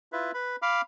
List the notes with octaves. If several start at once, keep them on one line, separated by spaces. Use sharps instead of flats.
E4 F4 B4 E5
B4 B5
F5 B5 D6 F6